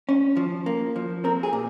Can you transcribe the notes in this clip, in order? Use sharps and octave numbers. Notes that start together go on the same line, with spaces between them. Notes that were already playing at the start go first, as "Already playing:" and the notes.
C#4
F3
A#3
F3
C4 A#4
G#4
A#2